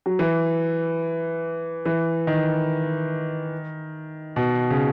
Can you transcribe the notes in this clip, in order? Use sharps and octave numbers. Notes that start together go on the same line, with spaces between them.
F#3
E3
E3
D#3
B2
C#3